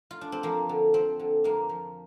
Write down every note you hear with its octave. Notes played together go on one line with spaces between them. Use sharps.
F4
D4
C4
F3 A#3
D3
F3 C4
D3
F2 A#3
F3